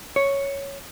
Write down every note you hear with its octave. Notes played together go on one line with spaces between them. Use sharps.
C#5